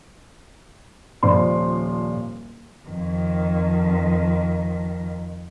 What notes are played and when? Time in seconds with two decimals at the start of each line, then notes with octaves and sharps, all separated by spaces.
1.23 D#1 F3 D5 C6
2.87 F2 D#3